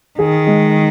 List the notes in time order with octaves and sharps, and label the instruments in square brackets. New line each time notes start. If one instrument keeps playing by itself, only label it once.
[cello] D#3 [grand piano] G#4
[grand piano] G#3